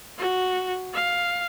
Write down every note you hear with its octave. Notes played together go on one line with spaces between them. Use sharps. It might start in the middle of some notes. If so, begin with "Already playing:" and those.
F#4
F5